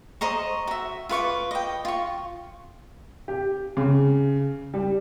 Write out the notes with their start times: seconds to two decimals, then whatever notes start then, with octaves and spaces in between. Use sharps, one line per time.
0.21 C5 D#5 A#5 C#6
0.67 F#4 E5
1.09 F4 B4 C#6 D6
1.51 D#5 G5
1.85 F4 C#6
3.28 G4
3.77 C#3
4.74 G3